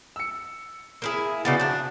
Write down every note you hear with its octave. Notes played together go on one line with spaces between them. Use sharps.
E6 C#7
A#3 E4 G#4
C#3 A#3 B3 F#4 D5 A6
F3 D4